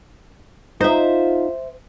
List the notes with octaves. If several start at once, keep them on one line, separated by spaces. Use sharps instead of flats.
D#4 F4 C5 E5